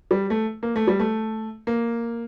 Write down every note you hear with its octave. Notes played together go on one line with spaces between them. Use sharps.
G3
A3
A#3
A3
G3
A3
A#3